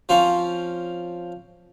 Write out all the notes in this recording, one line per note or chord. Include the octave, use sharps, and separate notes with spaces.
F3 C4 C#4 F4